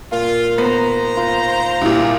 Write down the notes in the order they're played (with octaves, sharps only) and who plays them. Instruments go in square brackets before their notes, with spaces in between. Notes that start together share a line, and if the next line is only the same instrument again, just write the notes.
[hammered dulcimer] A#2 [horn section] F4
[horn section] D#3 C5 A#5 [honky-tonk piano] B3
[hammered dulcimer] F4
[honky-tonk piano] C2 A#2 [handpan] D4 E4 G4